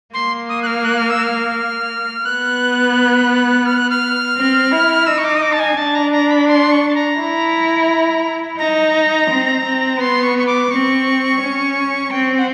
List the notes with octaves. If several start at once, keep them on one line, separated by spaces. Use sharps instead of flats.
A#3 C6
D#6
F#6
F6
F#6
F6
E6
F6
B3 F#6
F6
F#6
F6
C4
E4
D#4 E6
C#6
D6
D#6
D6
A5
G#5
D4 A5
A#5
A#5
B5
C6
C#6
A5
A#5
E4
D#4 A#5
C4
C4
B3 C6
C#6
C#6
D6
C4 C#6
C#4
C4 G5
F#5